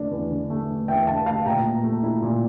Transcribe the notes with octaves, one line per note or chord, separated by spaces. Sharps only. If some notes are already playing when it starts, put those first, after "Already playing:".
Already playing: E2 D3 A3 D4
E2
D3
A3
D4
E2 E5 G5
D3 F5 A5
A3 F5 A5
A#2 G5 A#5
A#2
A3
E4
A#2